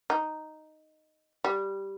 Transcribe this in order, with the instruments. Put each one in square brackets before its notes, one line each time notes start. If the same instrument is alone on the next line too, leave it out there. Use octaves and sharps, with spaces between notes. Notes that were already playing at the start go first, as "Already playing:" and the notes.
[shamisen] D#4
G3